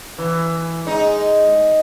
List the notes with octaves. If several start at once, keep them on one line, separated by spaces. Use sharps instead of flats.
E3
G#3 D#4